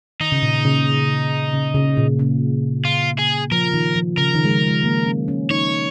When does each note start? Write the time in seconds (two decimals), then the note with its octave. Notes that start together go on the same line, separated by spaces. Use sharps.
0.20 D#3 D#4
0.32 C#3
0.42 A#2
0.65 C#3
1.53 C#3
1.75 C#3
1.97 A#2
2.19 C#3
2.85 F4
3.19 G#4
3.52 F3 A#4
3.74 D#3
3.95 F3
4.17 C#3 A#4
4.35 D#3
4.45 G#3
4.51 F3
4.67 G#3
4.84 A#3
5.06 C#4
5.28 C#4
5.50 D#4 C#5